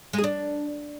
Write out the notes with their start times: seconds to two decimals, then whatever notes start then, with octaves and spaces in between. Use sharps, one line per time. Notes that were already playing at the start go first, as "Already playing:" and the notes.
0.13 G#3
0.18 G#4
0.24 D4